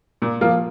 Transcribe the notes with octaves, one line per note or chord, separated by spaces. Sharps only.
A#2
F3 A#3 F4